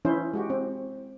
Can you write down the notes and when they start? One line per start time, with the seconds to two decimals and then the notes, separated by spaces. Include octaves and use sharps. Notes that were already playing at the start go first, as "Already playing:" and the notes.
0.05 E3 C#4 D#4 E4 C5
0.33 G#3 F#4 G4
0.50 C4